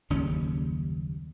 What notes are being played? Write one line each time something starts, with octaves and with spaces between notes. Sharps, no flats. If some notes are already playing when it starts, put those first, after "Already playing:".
F#1 D#2 G3 C#4